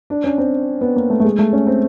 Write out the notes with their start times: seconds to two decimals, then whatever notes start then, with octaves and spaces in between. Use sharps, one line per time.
0.10 D4
0.24 C#4
0.38 C4
0.81 B3
0.96 A#3
1.10 A3
1.20 A3
1.25 G#3
1.39 A3
1.53 C#4
1.67 C4